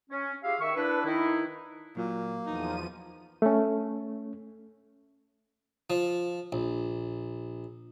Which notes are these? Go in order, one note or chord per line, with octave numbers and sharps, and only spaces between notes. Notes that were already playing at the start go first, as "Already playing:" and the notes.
C#4
F4 G4 G#4 E5 F5
D#3 E5 C#6
D4 E4 B4
D#3 D#4 E4
A#2 F#3 A#3 F4
E2 F3 D#4 D#7
A3 C#4
F3
A#1